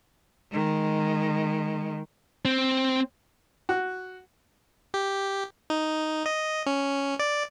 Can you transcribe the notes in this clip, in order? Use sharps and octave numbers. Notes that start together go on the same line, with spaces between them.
D#3 G#3
C4
F#4
G4
D#4
D#5
C#4
D5